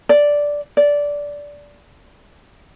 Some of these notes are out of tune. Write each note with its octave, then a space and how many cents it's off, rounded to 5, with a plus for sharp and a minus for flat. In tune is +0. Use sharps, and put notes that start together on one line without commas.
D5 -5
D5 -15